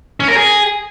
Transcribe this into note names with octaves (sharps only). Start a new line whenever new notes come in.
C#4
A#4
G#4